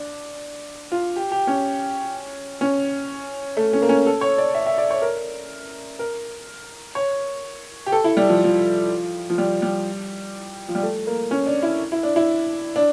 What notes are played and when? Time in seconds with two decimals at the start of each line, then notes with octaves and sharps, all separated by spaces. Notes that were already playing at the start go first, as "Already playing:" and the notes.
Already playing: D4
0.92 F4
1.16 G4
1.32 G4
1.47 C#4
2.61 C#4
3.57 A3
3.73 C#4
3.82 A#3
3.89 C#4
4.06 A4
4.21 C#5
4.38 D5
4.55 E5
4.67 E5
4.78 D5
4.91 C#5
5.02 A#4
5.99 A#4
6.95 C#5
7.86 G4
7.92 A4
8.04 E4
8.17 G3
8.29 F3
8.44 F3
9.30 F3
9.38 G3
9.62 G3
10.68 F3
10.75 G3
10.83 A3
11.07 A#3
11.31 C#4
11.46 D4
11.62 E4
11.92 E4
12.03 D4
12.16 E4
12.76 D4